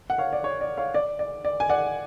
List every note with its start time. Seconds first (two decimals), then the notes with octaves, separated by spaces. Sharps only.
0.10 F#5
0.18 C#5 F5
0.33 D5
0.44 C#5
0.61 D5
0.77 C#5 F5
0.94 D5
1.19 D5
1.45 D5
1.60 G#5
1.69 D5 F#5